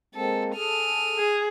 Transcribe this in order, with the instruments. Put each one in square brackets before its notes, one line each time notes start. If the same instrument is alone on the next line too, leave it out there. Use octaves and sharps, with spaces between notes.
[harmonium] G#3 A#3 C4 [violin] A4
[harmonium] G#4 A4 [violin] F6 D#7
[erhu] G#4